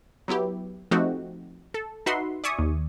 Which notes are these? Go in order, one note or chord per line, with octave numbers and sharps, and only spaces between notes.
F#3 B3 E4 G4
F3 A3 C4 D#4 F#4 G4
A4
D#4 F#4 B4 E5 F#5 C6
D5 E5 G#5 C#6 D#6
D#2